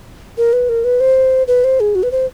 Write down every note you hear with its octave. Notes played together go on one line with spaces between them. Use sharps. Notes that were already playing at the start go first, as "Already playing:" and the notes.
A#4
B4
A#4
B4
C5
B4
C5
G#4
F#4
B4
C5